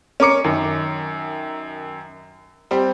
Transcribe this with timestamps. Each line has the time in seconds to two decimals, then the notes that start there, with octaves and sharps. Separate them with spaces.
0.20 C#4 A#4 D6 C#7
0.44 F#2 D#3
2.71 G3 C4